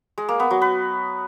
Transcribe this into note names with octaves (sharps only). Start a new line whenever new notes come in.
G#3
A#3
B3
F#3
B4